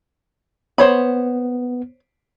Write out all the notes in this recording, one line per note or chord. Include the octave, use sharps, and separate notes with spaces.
B3 C5 C#5 B5